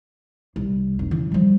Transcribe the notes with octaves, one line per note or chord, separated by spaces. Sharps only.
C2
F1
C#3 E3
F3 G3